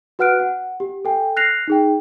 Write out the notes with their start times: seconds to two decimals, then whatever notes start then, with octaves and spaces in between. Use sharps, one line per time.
0.19 F#4 B4 F#5 F6 F#6 D7
0.40 F#5
0.80 G4
1.05 A4 G5 G#5
1.36 F6 F#6 A#6 C7 F7
1.68 D#4 G#4 G5